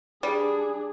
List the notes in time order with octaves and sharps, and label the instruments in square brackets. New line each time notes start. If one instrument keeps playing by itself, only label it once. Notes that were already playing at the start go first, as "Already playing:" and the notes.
[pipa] G3 [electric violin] D4 G#4